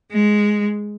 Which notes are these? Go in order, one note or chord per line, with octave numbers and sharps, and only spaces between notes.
G#3